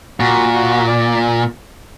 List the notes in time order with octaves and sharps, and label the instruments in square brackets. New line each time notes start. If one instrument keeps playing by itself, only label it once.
[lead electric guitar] A#2 [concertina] F#4
[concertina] F#4
D5